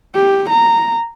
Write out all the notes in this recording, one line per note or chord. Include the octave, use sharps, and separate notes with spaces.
G4
A#5